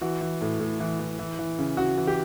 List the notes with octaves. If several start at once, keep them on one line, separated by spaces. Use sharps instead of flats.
E3 F#4
E3
A2
A2
E3
E3
E3
E3
C#3
C#3 F#4
E3
G4